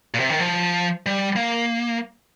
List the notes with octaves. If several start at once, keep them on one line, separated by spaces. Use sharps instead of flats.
A#2
C3
D#3
F3
G3
A#3